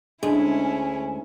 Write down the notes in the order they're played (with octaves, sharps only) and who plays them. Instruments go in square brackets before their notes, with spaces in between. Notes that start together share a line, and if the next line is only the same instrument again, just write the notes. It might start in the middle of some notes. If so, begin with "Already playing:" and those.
[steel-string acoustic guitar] D2 [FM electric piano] G#3 [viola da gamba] C#4 E4 [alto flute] G#5